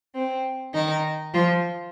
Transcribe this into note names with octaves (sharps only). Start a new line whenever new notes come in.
C4
D#3 D#4
F3 F4